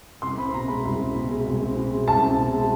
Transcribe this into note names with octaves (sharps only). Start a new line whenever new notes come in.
C2 C6
C4 B5
B2 A#5
G#3 B5
C2
C4
B2
G#3
C2
C4
B2
G#3
C2 A5
C4
B2
G#3